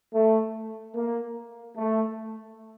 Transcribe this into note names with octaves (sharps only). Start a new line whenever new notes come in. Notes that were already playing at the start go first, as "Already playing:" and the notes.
A3
A#3
A3